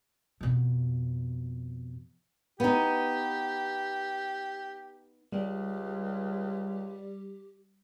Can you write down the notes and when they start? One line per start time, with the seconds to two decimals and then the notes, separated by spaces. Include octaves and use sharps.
0.41 F2 B2
2.60 B3 D#4 G4
5.32 C#2 G3 G4